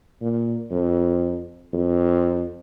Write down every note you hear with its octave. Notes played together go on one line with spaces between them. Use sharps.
A#2
F2
F2